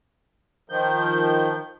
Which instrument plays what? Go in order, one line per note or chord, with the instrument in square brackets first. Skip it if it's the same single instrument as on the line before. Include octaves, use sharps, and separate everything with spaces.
[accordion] D#3 F3 G6